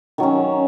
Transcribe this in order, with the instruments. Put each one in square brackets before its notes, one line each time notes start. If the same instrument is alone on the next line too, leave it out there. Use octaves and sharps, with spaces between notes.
[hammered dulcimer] D#3 F#3 C#4